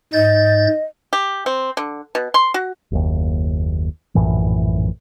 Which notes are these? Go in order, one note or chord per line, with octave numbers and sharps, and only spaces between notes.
G#2 D#5 G6 A6
G4
C4
D3
B2
C6
F#4
F#1 D#2
A#1 F#2 A2 E3